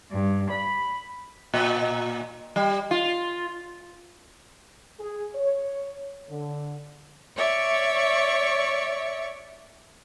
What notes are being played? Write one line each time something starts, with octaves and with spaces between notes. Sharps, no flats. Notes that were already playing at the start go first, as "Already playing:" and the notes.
G2
B5
A#2
G3
F4
G#4
C#5
D3
C#5 D5 E5 C#6